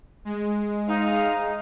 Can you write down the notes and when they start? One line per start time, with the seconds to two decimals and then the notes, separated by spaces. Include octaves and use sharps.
0.25 G#3
0.88 D#4 C5 D#5 F5